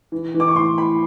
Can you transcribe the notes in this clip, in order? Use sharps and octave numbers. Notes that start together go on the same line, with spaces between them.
E3
E3
D6
C#6
A2 C6
A2 B5